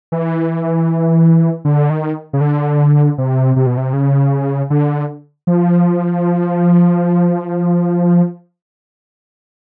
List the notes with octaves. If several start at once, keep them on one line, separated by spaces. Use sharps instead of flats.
E3
D3
D#3
C#3
D3
C3
C3
B2
C3
C#3
D3
F3